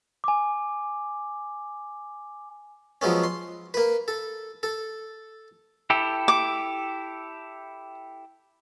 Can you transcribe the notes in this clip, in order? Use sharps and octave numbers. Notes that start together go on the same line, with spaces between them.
G#5 D6
F3 F#3 G#3 B3 C#4
C6
A#3 B4
A4
A4
E4 G4 A4
D6